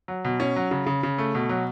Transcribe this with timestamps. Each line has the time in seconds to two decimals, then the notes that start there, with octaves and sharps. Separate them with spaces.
0.08 F#3
0.25 B2
0.40 C#4
0.56 F#3
0.71 C#3
0.86 C#3
1.03 C#3
1.18 A3
1.35 B2
1.49 F#3